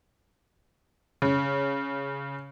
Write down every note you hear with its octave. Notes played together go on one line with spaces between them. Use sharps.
C#3